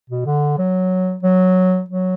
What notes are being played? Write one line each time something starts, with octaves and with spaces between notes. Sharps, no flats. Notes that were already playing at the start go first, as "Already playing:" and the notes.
B2
D3
F#3
F#3
F#3